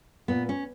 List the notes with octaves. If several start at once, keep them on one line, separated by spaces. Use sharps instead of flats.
A#2 B3
C#4